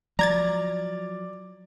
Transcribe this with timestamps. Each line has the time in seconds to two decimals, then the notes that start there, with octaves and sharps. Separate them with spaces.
0.19 F3 F#3 D5 A#5 G#6 A6